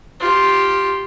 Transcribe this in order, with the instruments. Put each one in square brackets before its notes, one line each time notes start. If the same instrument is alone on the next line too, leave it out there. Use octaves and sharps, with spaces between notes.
[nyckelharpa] F4 G4